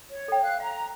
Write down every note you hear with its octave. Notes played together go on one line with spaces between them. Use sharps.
C#5
A4 G5
F5 F#6
F5 A#5